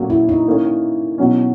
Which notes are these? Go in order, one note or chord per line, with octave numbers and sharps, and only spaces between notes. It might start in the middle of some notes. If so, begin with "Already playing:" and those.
Already playing: A#2 F#3 A#3 C#4 F#4
E4
D#4
D#3 A#3 C#4
B2 F#3 C#4